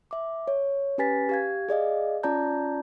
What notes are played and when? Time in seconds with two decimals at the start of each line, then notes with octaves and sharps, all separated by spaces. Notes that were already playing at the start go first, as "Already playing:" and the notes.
0.11 E5 D6
0.48 C#5
0.98 C#4 G4 B4 G#5 A6 B6
1.29 G4 F5 G#6
1.69 G#4 D5 D#5 F5
2.23 C#4 F4 D5 A5 A#5 G6